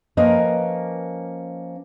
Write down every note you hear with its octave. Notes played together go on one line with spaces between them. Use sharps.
F3 A#3 C#4 A#4 B4 D#5